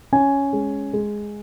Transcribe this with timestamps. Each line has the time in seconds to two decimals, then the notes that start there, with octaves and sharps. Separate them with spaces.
0.13 C#4 G#5
0.53 G#3
0.93 G#3